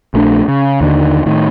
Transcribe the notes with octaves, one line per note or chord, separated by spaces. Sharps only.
A#1 A3 D4
C#3
D#2 D3 D#3
A2 D#3